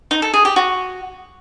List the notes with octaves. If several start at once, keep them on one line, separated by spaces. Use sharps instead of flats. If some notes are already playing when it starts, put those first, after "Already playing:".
D#4
A4
G#4
G4
F#4